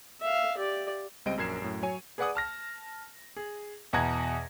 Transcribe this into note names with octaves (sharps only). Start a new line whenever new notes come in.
E5 F5
G4 D5
C#2 G3 C4 D#5 D7
A#1 F#2 A#4 G#6 C7 E7
F#2 A2
F#3 C#5 G#5 D#7
G#4 B4 D5 F#5 G#5 D#6
A5 F6 A#6
G#4
E2 B2 F#5 A#5 G#6 A#6